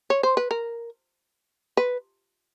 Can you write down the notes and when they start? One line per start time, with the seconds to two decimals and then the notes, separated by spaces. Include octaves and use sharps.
0.10 C#5
0.23 C5
0.37 B4
0.51 A#4
1.77 B4